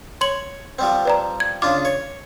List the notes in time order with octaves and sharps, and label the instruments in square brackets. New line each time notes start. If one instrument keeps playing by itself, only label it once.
[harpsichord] C#5 [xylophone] C6 F#7
[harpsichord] F3 G3 C4
[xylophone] B4 D5 A#5
G#6
[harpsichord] C#3 D4 F4 [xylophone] D6
[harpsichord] C#5